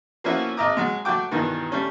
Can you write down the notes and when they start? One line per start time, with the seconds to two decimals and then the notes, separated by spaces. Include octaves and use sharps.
0.24 F3 A#3 B3 C#4 E4 F#4
0.57 G#1 D#5 E5 A#5 D6 D#6
0.77 F#3 G#3
1.05 F#3 A3 F#4 G5 D6
1.31 G2 B2 D#3 E3
1.72 G3 A3 C#4